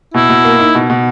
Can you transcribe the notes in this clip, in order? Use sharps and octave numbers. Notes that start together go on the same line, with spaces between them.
B2 E4
B2
A#3
D#4
B2
B2